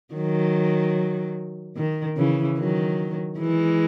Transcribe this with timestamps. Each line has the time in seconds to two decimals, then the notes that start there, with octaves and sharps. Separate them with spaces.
0.14 D#3 F#3
1.77 D#3
2.17 C#3 E3
2.58 D#3 F#3
3.39 E3 G#3